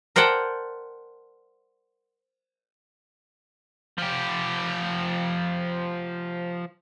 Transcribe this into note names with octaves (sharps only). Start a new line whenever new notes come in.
A#4 C5 D5 F#5 G5 A5
F3 G4